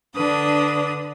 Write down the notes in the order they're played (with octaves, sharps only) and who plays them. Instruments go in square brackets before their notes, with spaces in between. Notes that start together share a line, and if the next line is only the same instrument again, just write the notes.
[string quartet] D3 D4 B4 D#6